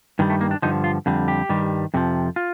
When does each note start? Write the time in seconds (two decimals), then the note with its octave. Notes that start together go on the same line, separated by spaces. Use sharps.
0.19 G2 D#3 G3
0.30 A3
0.41 A#3
0.51 D4
0.62 G2 D3 F3 D#4
0.84 F4
1.06 F2 D3 G3
1.28 G4
1.49 G2 D#3 G3
1.94 F2 C3 F3
2.36 F4